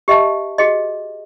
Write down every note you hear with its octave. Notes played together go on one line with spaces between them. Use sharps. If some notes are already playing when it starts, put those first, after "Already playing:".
G4 D#5 E5 G5 A5
F#4 G#4 D#5